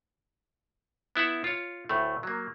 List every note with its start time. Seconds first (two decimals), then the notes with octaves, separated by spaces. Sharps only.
1.16 B3 E4 E5 F#5
1.44 F4 C#5
1.89 D2 A2 A3
2.23 F#3 A#3